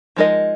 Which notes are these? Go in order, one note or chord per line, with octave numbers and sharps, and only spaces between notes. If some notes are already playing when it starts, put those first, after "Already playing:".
F3 G#3 D#4 A#4 D#5